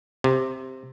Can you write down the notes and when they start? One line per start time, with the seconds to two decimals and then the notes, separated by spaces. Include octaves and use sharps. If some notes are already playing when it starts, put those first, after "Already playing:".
0.24 C3